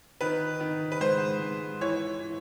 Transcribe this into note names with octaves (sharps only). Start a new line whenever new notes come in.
D#3 B4
D#3
B4
G#2 C5
G#2
E3 C#5
E3